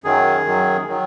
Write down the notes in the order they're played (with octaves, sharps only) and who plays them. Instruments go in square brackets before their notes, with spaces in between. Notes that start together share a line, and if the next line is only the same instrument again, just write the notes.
[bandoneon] F#2 D#3 F#3 G#4
F#2 D#3 F#3
D#3 F#3